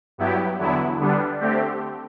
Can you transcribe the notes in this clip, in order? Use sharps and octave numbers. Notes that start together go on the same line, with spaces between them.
G2 F#3 B3 E4 G4
E2 D3 F#3 B3 E4
D3 G3 B3 D4
D3 A3 C4 G4